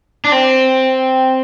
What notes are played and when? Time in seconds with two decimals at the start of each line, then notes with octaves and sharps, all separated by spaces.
0.24 D4
0.32 C4